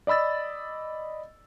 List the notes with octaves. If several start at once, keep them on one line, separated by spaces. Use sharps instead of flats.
D5 D#5 B5 E6 A6